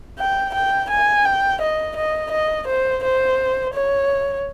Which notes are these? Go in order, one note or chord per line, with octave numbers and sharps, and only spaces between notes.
G5
G5
G#5
G5
D#5
D#5
D#5
C5
C5
C#5